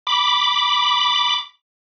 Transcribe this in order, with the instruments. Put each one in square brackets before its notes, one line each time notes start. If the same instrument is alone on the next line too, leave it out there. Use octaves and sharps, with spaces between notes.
[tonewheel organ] B5 D6